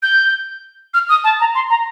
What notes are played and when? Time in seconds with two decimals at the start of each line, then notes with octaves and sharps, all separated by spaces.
0.02 G6
0.94 F6
1.09 D#6
1.24 A5
1.40 A#5
1.55 C6
1.70 A#5